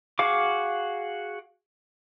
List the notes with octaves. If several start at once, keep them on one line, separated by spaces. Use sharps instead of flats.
F#4 G#4 F5 D6